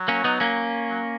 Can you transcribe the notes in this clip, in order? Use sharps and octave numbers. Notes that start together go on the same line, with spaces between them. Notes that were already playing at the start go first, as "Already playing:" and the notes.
Already playing: F#3
A#3 C#4
B3 D#4
A#3 C#4
F#3